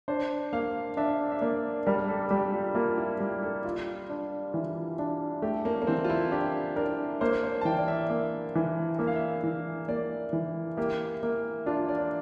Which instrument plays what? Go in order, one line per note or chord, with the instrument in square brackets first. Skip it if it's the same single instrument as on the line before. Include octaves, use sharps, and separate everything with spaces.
[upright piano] D4 [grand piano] C5
[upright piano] A#3 [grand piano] F5
[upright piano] D4 [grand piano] E5
[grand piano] E5
[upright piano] A#3 [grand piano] D5
[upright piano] G3 [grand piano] A#4
[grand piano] A4
A4
[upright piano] G3 [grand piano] G4
[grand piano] F4
[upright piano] A#3 [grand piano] F4
[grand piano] E4
[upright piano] G3 [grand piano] G4
[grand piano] A4
[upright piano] F4
D4
E3
D4
[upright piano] A3 [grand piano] G4
[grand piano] A#3
A#3
[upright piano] E3 [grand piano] C4
[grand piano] F4
E4
[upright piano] D4 [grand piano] G4
[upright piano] D4 [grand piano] A#4
[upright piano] A#3 [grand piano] C5
[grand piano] C5
A5
[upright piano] E3 [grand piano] G5
[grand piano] D5
E5
[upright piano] A#3
E3
[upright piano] A#3 [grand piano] E5
[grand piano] F5
E5
[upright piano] E3
[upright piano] A#3 [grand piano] D5
[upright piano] E3
[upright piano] A#3 [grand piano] G4
[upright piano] A#3
[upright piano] D4 [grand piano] F4
[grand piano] D5